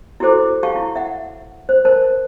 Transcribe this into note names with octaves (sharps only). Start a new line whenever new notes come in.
E4 F#4 G4 A4 C5 D6
G4 F5 A5 C#6
E4
E5 F#5
C5
A#4 C5 A5